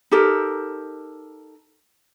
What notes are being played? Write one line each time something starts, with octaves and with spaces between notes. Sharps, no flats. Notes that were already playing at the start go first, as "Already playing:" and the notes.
D#4 G4 A4 A#4